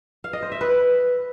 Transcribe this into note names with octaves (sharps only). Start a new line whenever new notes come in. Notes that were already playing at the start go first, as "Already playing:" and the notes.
F5
D#5
C5
E5
B4